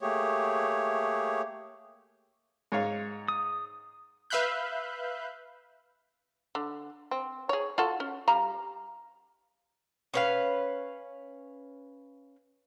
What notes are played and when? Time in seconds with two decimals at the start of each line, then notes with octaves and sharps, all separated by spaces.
0.01 A3 A#3 G4 G#4 C#5
2.72 G#2 C#5 F5
3.28 D#6
4.30 B4 E5 F5 B5 F#6 G6
6.55 D3
7.11 C4
7.49 G#4 C#5
7.78 F4 F#4 A4
8.00 C#4
8.28 G3 F5 A#5
10.14 C#4 B4 F5